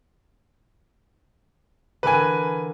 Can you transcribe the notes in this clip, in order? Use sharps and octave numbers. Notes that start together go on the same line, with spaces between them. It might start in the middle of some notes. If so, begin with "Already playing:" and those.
D3 E3 A#4 B4 G#5